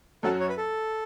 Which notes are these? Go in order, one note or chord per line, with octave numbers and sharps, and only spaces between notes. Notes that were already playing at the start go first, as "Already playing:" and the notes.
F#2 F#3 C#4 F#4 A4
C#5
B4
A4